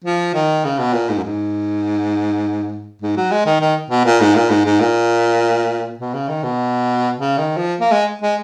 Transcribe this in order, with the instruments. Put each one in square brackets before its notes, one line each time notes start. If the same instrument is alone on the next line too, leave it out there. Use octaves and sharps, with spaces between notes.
[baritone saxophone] F3
D#3
C#3
B2
A#2
G#2
F#2
G#2
G#2
F#3
G#3
D#3
D#3
B2
A#2
G#2
A#2
G#2
G#2
A#2
B2
C#3
D#3
B2
C#3
D#3
F3
A#3
G#3
G#3